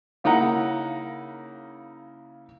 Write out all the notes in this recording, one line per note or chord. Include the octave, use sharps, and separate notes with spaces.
C#3 A#3 D#4 E4 F#5 A#5